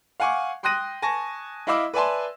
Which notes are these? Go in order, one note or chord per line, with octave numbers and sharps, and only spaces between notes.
F5 F#5 G#5 C#6 D6
G5 C6 D#6 F#6 A#6 D#7
G#5 A5 C#6 A#6
E4 D#5 F5 B5 D6 E6
B4 D5 E5 G#5 A5 C6